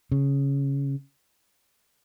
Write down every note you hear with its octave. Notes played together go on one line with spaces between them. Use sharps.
C#3